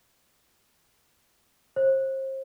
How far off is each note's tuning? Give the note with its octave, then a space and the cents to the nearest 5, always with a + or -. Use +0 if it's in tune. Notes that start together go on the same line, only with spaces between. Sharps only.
C5 +35